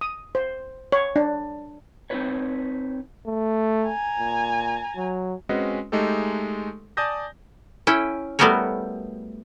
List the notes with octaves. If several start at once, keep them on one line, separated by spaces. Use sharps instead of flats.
D#6
C5
C#5
D4
C4 D#4 E4 G#4 B4 C#5
A3
G#5 A#5
A#2
F#3
G#3 C4 C#4 F#4 B4 D#5
G#3 A3 D#4 G4 A4
D5 G#5 A5 D#6 G6 A#6
C#4 E4 G5
G3 A3 B3 F#4 A#4 C#5